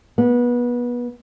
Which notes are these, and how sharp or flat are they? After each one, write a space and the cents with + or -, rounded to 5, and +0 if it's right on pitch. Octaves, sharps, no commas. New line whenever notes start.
B3 -25